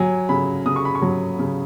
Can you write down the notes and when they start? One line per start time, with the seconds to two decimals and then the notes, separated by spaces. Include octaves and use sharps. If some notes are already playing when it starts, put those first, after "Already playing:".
Already playing: F#3 G#5
0.29 C#3 B5
0.65 C#3 D#6
0.76 C#6
0.85 B5
0.95 C#6
1.02 F#3
1.39 C#3